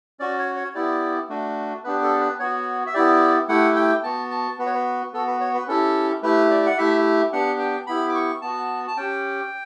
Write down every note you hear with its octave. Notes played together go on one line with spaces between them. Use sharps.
C#4 F#4 D5
C#5
C#5
B3 E4 G4 D5
A3 D4 F#4
B3 D4 G4 B4
A4
B4
B3 F#4 C#5
E5
B3 E4 G4 D5
A3 E4 G4 F#5
G5
B3 F#4 A5
A5
B3 F#4 B4
C#5
B4
B3 F#4 A4
B4
C#5
B4
C#4 E4 G4 A4
A3 E4 G4 B4
D5
F#5
A3 E4 G4 E5
B3 D4 G4 F#5
G5
B3 E4 G4 B5
D6
C#6
B3 F#4 A5
A5
C#4 G4 G5